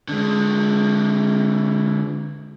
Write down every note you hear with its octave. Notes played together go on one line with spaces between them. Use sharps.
D3 G#3